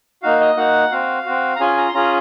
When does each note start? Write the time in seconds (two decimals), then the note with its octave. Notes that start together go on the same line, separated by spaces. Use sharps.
0.23 A#3 D#4 F#4 F5
0.40 D#5
0.57 A#3 D#4 F#4 F#5
0.92 C4 F#4 F5
1.25 C4 F#4
1.56 A#5
1.60 C#4 F4 G#4 G#5
1.77 A#5
1.89 C6
1.94 C#4 F4 G#4 A#5